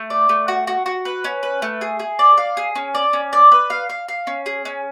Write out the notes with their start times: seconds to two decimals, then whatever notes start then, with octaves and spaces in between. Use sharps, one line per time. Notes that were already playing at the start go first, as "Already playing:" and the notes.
Already playing: A3
0.10 D5
0.29 A3
0.48 F#4
0.67 F#4
0.86 F#4
1.05 B4
1.24 C#4
1.43 B4
1.62 A3
1.81 G#4
1.99 G#4
2.19 D5
2.37 F5
2.57 G#4
2.76 C#4
2.95 D5
3.13 C#4
3.33 D5
3.52 B4
3.70 F5
3.89 F5
4.08 F5
4.27 C#4
4.46 G#4
4.65 C#4